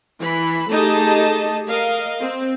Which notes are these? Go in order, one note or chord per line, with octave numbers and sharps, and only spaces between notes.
E3 B5
A3 D#4 G4 G#4 D#5 A5
A#4 D#5 F5
C4